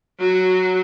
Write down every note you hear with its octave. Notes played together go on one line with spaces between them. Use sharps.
F#3 F#4